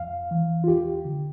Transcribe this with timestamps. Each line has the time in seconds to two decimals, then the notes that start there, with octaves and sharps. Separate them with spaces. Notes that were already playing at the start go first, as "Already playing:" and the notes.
Already playing: F2 F5
0.31 E3
0.64 F4
0.68 E2 G4
1.05 D3